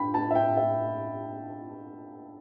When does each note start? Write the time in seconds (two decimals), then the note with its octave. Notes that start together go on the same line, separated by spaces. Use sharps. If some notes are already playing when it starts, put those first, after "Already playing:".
Already playing: D3 G5 B5
0.14 A5
0.31 E5
0.35 G5
0.57 E5